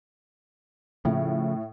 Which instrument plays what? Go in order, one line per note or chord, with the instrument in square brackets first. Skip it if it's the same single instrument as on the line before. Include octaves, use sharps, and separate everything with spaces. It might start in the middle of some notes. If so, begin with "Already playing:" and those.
[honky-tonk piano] A2 [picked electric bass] C#3 F3